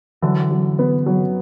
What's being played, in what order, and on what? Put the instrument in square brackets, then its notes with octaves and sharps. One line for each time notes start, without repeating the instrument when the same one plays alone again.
[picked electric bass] D3 E3 [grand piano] F#3
[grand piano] F#3
B3
F#3